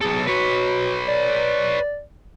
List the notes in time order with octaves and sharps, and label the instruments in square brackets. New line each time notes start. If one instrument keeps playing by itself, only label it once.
[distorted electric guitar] B1 A4 [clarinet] G#4
[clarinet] F#4 [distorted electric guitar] B4 C#5
[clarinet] D5